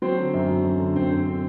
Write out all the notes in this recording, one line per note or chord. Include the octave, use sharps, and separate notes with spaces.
F#3 C4 C5
D3
F#2
F#3
F#2
D3
F#2 C4 C5
D3